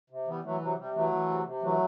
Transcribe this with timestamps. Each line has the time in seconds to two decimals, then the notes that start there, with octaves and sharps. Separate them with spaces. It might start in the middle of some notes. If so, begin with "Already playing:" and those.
0.10 C3
0.27 E3 G3 B3
0.44 E3 F#3 A3
0.61 C3 F#3
0.78 C3 G3
0.94 E3 F#3 A3
1.12 E3
1.29 C3
1.45 C3
1.62 E3 F#3 A3